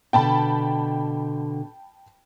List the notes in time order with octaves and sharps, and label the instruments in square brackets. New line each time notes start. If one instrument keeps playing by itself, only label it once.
[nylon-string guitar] B2 D3 [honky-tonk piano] G5 A5 B5